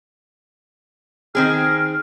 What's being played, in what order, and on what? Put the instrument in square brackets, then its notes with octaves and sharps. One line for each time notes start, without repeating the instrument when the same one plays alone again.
[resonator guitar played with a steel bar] D#3 C4 G#4 [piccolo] F6